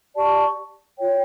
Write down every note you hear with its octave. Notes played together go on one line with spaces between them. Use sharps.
G4 D5 A5 C#6
F4 C#5 G5